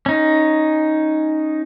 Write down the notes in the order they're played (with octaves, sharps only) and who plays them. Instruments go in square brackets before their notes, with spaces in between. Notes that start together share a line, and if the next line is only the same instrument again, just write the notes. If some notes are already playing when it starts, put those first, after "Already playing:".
[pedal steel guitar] C#4 D#4